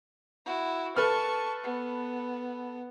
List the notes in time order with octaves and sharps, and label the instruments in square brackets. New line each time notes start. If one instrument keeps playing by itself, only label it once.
[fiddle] E4 F#4
[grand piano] A4 B4 F6 [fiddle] A5 C#6
[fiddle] B3